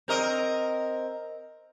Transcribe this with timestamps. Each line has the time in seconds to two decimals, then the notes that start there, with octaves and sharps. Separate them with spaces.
0.08 C4 A#4 D#5